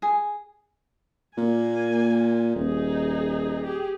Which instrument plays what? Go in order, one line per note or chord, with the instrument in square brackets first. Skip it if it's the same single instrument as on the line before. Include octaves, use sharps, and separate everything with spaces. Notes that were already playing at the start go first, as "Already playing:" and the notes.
[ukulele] G#4
[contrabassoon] A#2 [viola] A#3 G#5
[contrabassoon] D#1 [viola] D#4 G#4
[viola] G4 G#4